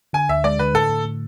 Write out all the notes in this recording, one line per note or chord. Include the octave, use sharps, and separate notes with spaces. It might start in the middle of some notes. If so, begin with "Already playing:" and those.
D3 G#5
D2 E5
G#3 D5
D3 B4
A2 A4
A2
A2